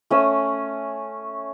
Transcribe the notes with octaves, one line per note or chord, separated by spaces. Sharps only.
A3 C#4 D#6 E6